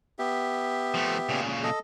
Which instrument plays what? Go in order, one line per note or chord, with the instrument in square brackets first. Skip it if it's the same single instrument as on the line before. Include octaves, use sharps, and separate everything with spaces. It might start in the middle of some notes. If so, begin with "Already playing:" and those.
[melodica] B3 G4 E5
[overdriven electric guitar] F3 A3
A#2 C#3
[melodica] A4 D#5